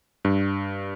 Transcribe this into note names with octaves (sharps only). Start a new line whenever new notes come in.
G2